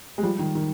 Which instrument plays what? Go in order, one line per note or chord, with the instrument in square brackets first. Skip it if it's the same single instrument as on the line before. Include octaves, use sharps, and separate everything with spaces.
[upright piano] G#3
F3 G3
D#3
D#3